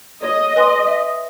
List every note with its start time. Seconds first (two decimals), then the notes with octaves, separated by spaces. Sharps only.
0.22 C#5 D#5
0.56 B4 G#5 C6
0.87 E5